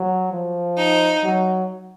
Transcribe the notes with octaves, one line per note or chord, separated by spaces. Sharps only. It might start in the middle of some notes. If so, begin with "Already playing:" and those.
Already playing: F#3
F3
D#4
F#3